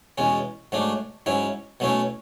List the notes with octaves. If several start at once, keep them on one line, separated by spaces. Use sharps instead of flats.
E2 B2 G#3 C#4
G#2 F#3 A3 D4
G#2 F#3 C#4 E4
B2 F#3 A3 C#4 E4